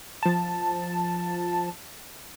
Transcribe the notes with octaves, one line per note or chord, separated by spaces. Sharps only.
F3 A5